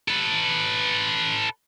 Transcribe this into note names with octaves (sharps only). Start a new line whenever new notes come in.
A4 B4